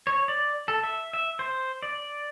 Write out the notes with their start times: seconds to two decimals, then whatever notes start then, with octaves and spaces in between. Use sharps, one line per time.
0.07 C#5
0.28 D5
0.68 A4
0.84 E5
1.13 E5
1.39 C5
1.83 D5